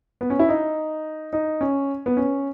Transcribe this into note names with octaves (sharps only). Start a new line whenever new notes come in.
B3
C#4
E4
D#4
D#4
C#4
B3
C#4